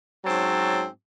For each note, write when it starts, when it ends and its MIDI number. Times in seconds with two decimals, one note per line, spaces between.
0.25 0.87 44
0.25 0.87 54
0.25 0.87 60
0.25 0.87 61
0.25 0.87 81